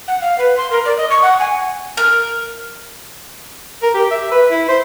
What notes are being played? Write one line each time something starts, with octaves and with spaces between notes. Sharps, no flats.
F#5
F5
B4
C6
A#4
D5
D#5
C#6
F#5
G#5
A#4
A#4
G4
E5
B4
E4
C5